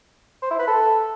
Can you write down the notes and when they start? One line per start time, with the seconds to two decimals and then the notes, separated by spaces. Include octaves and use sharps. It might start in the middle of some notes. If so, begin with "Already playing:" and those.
0.42 C5
0.51 E4
0.59 B4
0.67 A4